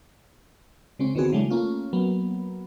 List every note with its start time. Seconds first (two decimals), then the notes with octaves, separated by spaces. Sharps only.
0.99 C#3 G#3 C4 C#4
1.15 D3 D#3 B3 C4 F#4 G#4
1.32 C#3 E3 F#3 G#3 A3 D4
1.50 A3 A#3 C#4 F4
1.93 F#3 A#3 B3